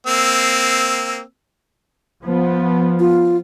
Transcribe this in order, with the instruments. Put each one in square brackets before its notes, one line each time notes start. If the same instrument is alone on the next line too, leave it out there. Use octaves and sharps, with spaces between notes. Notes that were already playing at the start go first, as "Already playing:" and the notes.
[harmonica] A#3 C4 E6
[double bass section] F3 B3
[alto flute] F4